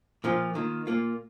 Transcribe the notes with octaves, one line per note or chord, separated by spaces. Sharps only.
A#2 F3 A#3 F4
D#3 A#3 F4
A#2 A#3 F4